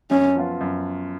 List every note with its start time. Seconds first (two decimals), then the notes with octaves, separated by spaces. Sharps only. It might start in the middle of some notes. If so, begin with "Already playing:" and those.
0.11 F#2 C#4
0.36 F3 B3 F4
0.61 F#2